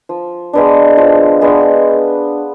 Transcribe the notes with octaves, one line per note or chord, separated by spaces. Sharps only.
F3
G#3 B3 D4
F3
G#3 B3 D4